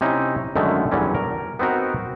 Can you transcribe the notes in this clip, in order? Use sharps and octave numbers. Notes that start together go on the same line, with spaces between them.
C3 C#4 D#4 E4
F#2 D3 D#3 G#3 A3
E2 D3 F#3 G3 C#4
A#4
B3 C4 D#4 F#4 A#4